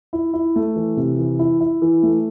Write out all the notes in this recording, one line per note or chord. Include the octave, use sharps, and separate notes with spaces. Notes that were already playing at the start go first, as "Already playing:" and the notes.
E4
E4
A3
E3
C3
E3
E4
E4
E3
A3